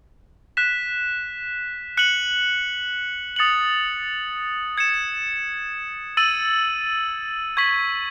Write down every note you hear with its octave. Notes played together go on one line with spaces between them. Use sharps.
F#6 B6 E7
F#6 C#7 F#7
D#6 A6 C#7 F#7
G#6 C#7 E7
E6 A6 D#7 F#7
C#6 G#6 B6 F#7